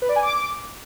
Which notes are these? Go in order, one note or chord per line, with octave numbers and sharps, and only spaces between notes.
B4
D5
G#5
D6